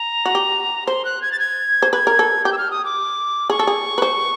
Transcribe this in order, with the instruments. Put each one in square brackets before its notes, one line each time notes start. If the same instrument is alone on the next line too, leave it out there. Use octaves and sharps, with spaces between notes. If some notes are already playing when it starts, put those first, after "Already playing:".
Already playing: [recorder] A#5
[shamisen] F#4
G4
[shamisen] C5 [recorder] C6
[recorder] F#6
G#6
A6
G#6
[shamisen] C5
[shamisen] B4 [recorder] G#6
[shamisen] A#4
A4
[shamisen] G4 [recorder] G6
[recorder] E6
F6
D#6
D6
[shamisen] G#4 [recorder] C#6
[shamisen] A4
G#4
B4
C5